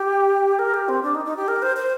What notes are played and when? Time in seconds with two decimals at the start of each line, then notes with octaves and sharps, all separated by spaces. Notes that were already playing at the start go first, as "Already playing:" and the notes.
Already playing: G4
0.59 A#4
0.74 G4
0.88 C4
1.03 D4
1.15 D#4
1.25 D#4
1.36 G4
1.48 A#4
1.62 C5
1.76 C5